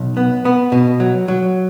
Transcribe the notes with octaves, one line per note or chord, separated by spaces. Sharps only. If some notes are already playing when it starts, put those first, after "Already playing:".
Already playing: B1
B3
B3
B2
F#3
F#3